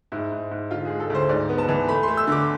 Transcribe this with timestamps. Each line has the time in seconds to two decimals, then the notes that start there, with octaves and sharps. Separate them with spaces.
0.12 G#2 E4
0.32 G#2
0.51 G#2
0.71 D3 F4
0.85 G#3 G#4
1.00 A4
1.10 D2 C5
1.29 G#2 D5
1.49 B3
1.58 A5
1.69 E3
1.88 A3 B5
2.03 A3 C6
2.17 E6
2.27 D3 D6